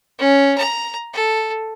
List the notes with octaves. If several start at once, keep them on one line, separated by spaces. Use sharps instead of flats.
C#4
A#5
A4